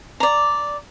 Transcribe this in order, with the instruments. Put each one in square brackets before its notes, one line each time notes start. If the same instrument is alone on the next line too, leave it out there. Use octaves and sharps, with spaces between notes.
[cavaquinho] D5 A#5